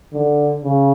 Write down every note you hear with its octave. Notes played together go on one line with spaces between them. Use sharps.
D3
C#3